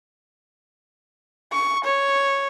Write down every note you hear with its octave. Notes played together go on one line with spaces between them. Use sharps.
C#6
C#5